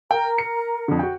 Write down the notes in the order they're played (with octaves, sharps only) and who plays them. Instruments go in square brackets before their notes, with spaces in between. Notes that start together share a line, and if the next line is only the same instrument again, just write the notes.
[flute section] A#4 A#5 [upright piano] G5
[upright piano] C#7
F2 D3
F#4 G5